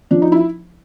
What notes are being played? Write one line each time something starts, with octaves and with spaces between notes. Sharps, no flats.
F3 D4
D#4
E4